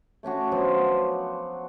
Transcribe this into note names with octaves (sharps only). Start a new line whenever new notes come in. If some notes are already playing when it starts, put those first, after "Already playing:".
A3 C#4 D4 F#4
F3 F#3 B3 C5